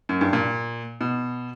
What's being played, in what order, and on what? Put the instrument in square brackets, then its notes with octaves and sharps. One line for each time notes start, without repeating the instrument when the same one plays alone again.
[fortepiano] F#2
G2
A#2
B2